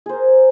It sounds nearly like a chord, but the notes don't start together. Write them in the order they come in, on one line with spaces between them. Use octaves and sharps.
G#4 C5 A#4